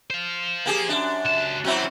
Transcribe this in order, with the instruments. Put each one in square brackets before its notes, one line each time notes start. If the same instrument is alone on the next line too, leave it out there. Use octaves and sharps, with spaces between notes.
[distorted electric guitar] C5 F5
[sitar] A#3 G4 G#4
F#2 D4
[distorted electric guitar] C#2 A5
[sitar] F#3 C4 E4 [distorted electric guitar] C#4 G4